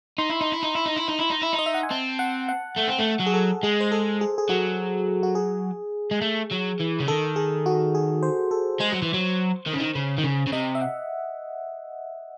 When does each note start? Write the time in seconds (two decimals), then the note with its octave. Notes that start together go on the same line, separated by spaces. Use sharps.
0.18 D#4 C6
0.30 E4
0.41 D#4
0.52 E4
0.63 D#4
0.75 E4
0.86 D#4
0.96 E4
1.08 D#4
1.19 E4
1.30 D#4
1.42 E4
1.53 D#4
1.59 D#5
1.66 E5
1.74 F#5
1.83 G#5
1.91 C4 A5
2.19 F#5
2.49 F#5
2.77 A3
2.89 C4
2.99 A3
3.20 F#3
3.26 G#4
3.34 A4
3.63 G#3 G#4
3.81 C5
3.92 A4
4.21 G#4
4.38 G#4
4.49 F#3 F#4
5.23 F#4
5.35 G#4
6.11 G#3
6.21 A3
6.51 F#3
6.80 E3
7.00 C#3
7.08 D#3 A4
7.36 G#4
7.66 F#4
7.95 G#4
8.23 C5
8.51 A4
8.80 G#3 C5
8.92 F#3
9.02 E3
9.14 F#3
9.67 D#3
9.73 C#3
9.80 D#3
9.95 C#3
10.18 D#3
10.24 C#3
10.47 C#3
10.53 C3 D#5
10.75 E5
10.82 F#5